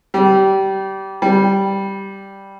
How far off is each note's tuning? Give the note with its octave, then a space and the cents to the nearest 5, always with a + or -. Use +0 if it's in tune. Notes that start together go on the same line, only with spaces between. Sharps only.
G3 -25
G3 -5